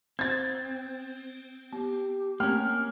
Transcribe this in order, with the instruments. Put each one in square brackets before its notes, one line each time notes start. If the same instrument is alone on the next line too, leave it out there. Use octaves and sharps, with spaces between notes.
[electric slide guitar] C4 [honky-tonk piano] G#6 A6
[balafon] B3 [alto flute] G4
[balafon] A3 C4 [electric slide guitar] A#3 C#4 [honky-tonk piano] F6